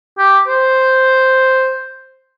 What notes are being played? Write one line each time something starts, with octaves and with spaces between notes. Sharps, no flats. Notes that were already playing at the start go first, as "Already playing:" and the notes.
G4
C5